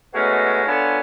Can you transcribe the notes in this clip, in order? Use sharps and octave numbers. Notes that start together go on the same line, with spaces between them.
G#3 A3 B3 C#4 D#4 F#4
B3 D4 F4 A4 C#5 G#5